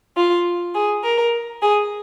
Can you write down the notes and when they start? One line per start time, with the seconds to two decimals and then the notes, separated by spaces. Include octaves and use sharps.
0.16 F4
0.74 G#4
1.03 A#4
1.62 G#4